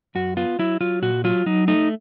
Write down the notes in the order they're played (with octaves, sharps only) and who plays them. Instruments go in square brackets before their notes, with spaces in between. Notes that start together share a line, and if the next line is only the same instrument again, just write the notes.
[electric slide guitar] F#2 F#4
B3 F4
F#3 E4
F#3 F4
A#2 F#4
F#3 F4
F#3 D#4
A3 D#4